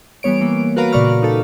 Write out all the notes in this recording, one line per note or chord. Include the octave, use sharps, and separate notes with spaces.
E3 G3 B3 C#5 D7
E3 A#3
F#4 A#4 B4 F5 A#5 B5
A#2 C#3 D5 C#6 F6
D#4 A4